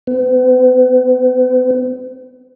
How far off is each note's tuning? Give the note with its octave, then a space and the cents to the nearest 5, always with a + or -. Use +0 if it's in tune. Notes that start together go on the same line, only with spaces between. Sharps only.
B3 +45